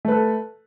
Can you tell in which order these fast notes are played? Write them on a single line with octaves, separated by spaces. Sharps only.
A3 B4 A4